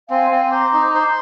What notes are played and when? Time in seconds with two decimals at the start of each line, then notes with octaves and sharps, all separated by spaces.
0.10 C4 F5 G#5
0.31 C4
0.52 C5 A#5 D6
0.73 D#4
0.94 C5